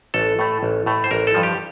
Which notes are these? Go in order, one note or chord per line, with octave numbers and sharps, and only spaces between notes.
A1 A4
A2 A3
A1
A2 A3
C5
A1 A#4
A4
G2 F3
G4